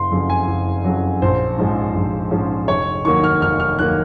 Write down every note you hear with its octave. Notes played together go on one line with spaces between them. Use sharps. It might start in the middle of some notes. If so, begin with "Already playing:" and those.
Already playing: F#1 C6
F2 C#3 F#3
G#5
F#1
F2 C#3 F#3
A#1 C5
G#2 F3 G#3 C#4
A#1
G#2 F3 G#3 C#4
F1 C#5
D#2 D#3 F#3 A#3 C#6
F6
F1 F6
F6
D#2 D#3 F#3 A#3 F#6